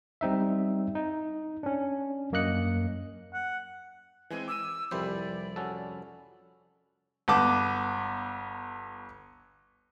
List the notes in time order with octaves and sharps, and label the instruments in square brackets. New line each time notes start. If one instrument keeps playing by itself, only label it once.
[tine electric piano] G3 C4 D#4 E5
D#4
C#4 D4
F#2 A#3 D#5 F#6 C#7
[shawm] F#5
[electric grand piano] E3 G#3 C4 [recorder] G#5
[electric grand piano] D6 D#7 [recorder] E6
[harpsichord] C2 F2 [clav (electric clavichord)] E3 G3 C5 [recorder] D5 [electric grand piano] B5
[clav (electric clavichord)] C#4 F#4 A4
[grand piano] G1 B3 A5 D6